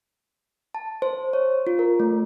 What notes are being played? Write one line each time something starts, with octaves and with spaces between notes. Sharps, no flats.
A5
C5
C#5
F4
A#4
A3